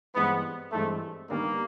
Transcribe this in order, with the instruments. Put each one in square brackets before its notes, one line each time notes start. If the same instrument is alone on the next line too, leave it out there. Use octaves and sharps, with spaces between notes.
[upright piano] G2 E3 G#3 C4 [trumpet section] B3
[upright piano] G2 E3 G#3 C4 [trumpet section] A3
[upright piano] D#3 G3 B3 D4 [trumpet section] A#3